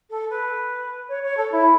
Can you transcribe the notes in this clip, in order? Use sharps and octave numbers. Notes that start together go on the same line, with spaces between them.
A4
B4
C#5
C#5
A4
E4